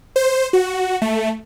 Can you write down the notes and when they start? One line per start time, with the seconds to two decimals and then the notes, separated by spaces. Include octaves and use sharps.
0.16 C5
0.53 F#4
1.02 A3